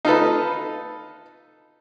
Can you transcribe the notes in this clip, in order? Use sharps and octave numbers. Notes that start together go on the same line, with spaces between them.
D#4 F4 A4 B4